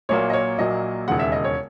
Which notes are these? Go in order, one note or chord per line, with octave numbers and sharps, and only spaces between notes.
A#1 A#2 F#3 A#3 C#5
D#5
C#5
A#1 A#2 F#3 A#3 D#5
E1 D#2 C#3 F#5
E5
D#5
C#5